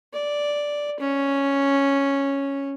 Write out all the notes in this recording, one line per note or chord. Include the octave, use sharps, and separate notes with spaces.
D5
C#4